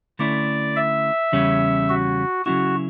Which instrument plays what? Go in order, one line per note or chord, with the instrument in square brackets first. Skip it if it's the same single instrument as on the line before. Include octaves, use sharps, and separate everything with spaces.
[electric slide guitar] D3 A3 C#4 E4 [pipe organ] D5
[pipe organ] E5
[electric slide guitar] E2 C#3 G3 C#4
[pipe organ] F#4
[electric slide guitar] C#3 F#3 C#4 E4 [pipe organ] F#4